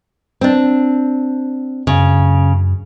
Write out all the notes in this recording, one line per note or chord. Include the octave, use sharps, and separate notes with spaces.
C4 D4
F#2 C#3